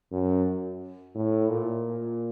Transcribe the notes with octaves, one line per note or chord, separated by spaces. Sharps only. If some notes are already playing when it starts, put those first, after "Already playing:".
F#2
A2
A#2